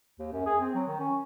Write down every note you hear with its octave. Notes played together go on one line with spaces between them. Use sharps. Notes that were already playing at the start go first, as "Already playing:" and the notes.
D#2
F#2
G#4
C4
F#3
D#3
C#4